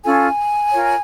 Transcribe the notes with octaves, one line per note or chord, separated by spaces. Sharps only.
C#4 F4 A4 G#5
F4 A#4 C#5